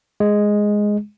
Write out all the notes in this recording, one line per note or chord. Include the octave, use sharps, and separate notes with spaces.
G#3